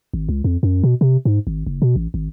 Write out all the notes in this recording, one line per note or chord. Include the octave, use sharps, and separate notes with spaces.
G#1
C#2
F2
F#2
B2
C3
G#2
G#1
F#1
B2
A1
G#1